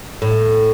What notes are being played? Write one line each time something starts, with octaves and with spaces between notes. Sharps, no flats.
A2